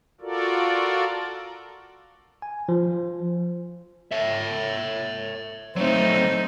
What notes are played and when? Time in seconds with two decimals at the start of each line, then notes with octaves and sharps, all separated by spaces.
0.21 F4 F#4 A4 A#4 D5
2.42 G#5
2.69 F3
4.11 C#5 E5
5.76 F#3 A3 C4 D#4